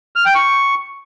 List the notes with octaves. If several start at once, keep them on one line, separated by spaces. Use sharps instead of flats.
F6
G5
C#6